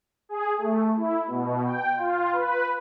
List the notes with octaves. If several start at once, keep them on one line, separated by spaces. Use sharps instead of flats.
G#4
A3
E4
B2
G5
F4
B4